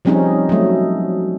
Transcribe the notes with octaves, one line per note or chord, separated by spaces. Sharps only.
F3 G3 C4 C#4 D#4 G#4
F#3 A3